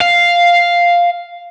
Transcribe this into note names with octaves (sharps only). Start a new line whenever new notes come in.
F5